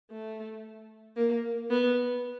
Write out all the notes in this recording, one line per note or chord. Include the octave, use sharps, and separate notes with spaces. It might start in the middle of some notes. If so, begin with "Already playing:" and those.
A3
A#3
B3